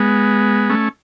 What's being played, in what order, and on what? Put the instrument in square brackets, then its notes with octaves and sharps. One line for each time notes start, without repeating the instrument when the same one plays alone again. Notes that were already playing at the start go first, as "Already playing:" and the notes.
Already playing: [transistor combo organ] G#3 B3
A3 C#4